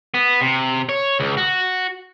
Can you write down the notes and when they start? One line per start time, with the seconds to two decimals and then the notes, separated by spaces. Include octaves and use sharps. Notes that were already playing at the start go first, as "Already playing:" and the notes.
0.14 B3
0.41 C3
0.89 C#5
1.20 C#2
1.37 F#4